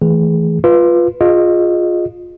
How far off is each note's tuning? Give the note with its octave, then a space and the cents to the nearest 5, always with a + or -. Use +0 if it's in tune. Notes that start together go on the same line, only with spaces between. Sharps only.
E3 +0 A3 +0 G#4 +0
F4 +0 B4 +0
F4 +20 G#4 +0 D#5 -10